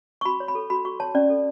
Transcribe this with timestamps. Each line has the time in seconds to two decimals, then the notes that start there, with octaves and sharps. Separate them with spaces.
0.21 C#6
0.25 F#4 B5
0.40 C#5
0.48 B5
0.55 A4
0.70 F#4 B5
0.85 F#4 C#6
1.00 C#5 A5
1.15 C#4 D5
1.30 A4